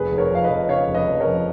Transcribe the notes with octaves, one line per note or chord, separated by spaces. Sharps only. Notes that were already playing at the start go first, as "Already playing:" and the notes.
Already playing: F1 G#4 B4
F1
A#4 C#5
F2 F5
B4 D#5
F2
C#3 C#5 F5
F1
B4 D#5
F1
A#4 C#5
F2